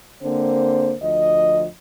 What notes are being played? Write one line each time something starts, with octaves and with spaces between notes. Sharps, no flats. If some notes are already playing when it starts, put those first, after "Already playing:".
D3 A#3 C4 C5
D2 F3 D#5